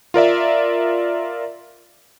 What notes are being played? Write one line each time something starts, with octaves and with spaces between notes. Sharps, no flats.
F4 A#4 D5 E5